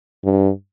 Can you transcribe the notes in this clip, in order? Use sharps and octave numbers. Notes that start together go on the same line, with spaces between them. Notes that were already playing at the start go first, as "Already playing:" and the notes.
G2